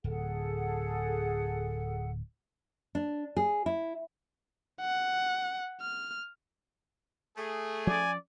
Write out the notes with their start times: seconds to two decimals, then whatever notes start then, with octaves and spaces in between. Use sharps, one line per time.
0.04 D1 G#4 A4 F#5
2.95 D4
3.37 G#4
3.66 E4
4.81 F#5
5.81 F6
7.36 A3 G#4
7.87 F3 C#4 D5 G#5